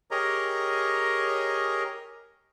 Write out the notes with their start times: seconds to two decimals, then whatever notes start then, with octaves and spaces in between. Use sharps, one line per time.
0.11 G4 G#4 A#4 C#5 D#5 A#5